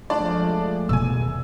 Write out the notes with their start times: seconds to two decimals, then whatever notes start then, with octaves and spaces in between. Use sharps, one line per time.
0.10 F3 G#3 A3 D4 D5
0.89 E2 B2 D#3 G#5 E6